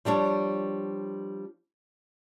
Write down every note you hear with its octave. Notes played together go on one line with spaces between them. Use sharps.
F3 G3 D4 C#5